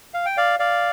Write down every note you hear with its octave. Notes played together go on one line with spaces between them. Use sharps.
F5
G5
D5 F5
D5 F5